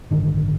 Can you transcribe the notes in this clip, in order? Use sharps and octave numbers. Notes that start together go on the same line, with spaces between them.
A1 G2 D3 D#3